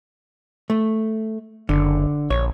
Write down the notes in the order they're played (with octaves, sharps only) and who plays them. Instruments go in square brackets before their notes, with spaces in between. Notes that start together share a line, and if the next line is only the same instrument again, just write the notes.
[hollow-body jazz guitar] A3
[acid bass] F#1 [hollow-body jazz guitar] D3
[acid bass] A#1 [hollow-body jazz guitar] C#5